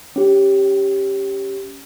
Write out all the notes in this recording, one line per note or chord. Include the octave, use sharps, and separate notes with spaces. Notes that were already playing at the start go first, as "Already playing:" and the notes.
C#4 G4